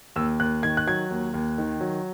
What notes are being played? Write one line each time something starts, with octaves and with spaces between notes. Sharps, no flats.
D#2 E6
D#2 F#6
D#3 G#6
F#6
F#3 G#6
D#2
D#2
D#3
F#3